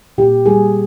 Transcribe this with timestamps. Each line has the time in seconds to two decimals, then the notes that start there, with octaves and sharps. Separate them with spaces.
0.18 A#2 G4
0.45 G3 A#3 G#4